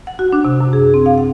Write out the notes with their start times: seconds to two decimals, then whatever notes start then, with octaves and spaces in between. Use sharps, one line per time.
0.07 F#5
0.19 F#4
0.33 D4
0.45 C3
0.60 F#2
0.73 G#4
0.94 C4
1.06 F5
1.18 F#5